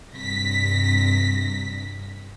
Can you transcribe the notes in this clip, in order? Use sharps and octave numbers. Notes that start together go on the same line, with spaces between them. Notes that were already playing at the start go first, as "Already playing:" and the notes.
G2 C3 A#6 B6